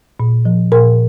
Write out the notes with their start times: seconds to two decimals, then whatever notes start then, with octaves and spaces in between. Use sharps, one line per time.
0.20 A#2
0.45 F3
0.72 A#2 A#4